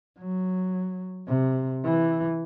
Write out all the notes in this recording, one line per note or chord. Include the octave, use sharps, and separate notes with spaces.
F#3
C3
E3